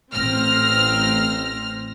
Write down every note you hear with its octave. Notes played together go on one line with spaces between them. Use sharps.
A1 C4 F6 A#6